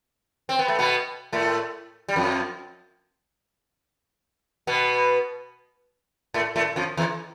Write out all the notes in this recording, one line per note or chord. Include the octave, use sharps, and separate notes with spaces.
C4
B3
A3
B2 B3
A2 A3
G3
F2 F3
B2 B3
A2 A3
A2 A3
F2 F3
E2 E3